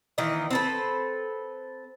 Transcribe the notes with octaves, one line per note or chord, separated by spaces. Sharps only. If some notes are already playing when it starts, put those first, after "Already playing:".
D#3 E3 A#3 D#5
C4 A4 B4